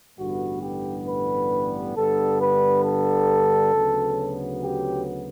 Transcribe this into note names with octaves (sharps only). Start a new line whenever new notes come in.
A1 G2 D3 G3 B3 F#4
G4
B4
G2 D3 G3 B3 A4
B4
A4
D2 C#3 F#3 B3
G4